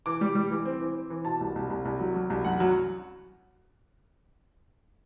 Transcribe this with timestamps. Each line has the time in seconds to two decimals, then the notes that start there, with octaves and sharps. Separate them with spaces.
0.06 E3 D6
0.21 G3
0.35 G3
0.51 E3
0.66 C4
0.81 E3
0.95 C4
1.10 E3
1.25 B2 A5
1.41 C2
1.56 C2
1.70 C2
1.85 C2
1.99 F#3
2.15 F#3
2.30 C2
2.44 F#2 F#5
2.60 F#3